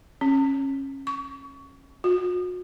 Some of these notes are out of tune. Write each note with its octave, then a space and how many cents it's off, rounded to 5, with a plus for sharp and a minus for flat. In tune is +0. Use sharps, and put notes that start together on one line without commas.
C#4 -25
C#6 +25
F#4 -45